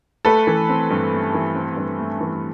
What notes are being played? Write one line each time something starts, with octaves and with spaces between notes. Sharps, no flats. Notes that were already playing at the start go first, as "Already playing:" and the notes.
A3 A4 B4
E3
C4
G2
A3
E3
C4
G2
A3
E3